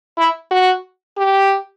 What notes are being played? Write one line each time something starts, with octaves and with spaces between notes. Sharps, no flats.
E4
F#4
G4